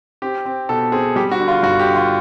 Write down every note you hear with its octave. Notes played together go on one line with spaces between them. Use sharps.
C4 G4
C4
B2 A4
C4 G#4
G3 G4
F#4
D3
F4
G2 F#4
G4
D3
F4